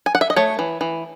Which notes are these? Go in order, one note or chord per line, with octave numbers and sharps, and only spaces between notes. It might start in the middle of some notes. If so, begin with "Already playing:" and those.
G#5
F#5
E5
D#5
A3 C#5
E3
E3